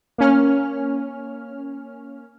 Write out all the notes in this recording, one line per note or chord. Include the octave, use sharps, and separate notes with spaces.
A#3 C#4 F6